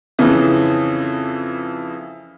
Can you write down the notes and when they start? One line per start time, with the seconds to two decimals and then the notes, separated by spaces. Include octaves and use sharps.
0.19 F2 C#3 E3